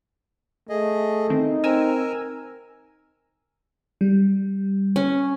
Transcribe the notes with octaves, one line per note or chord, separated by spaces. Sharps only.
A3 G#4 D#5
D#3 C4 D#4
C4 A#4 G#5 A#5 E6
G3
C#4